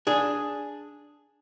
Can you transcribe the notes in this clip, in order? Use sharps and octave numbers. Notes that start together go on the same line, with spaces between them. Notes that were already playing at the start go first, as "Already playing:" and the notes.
D4 G#4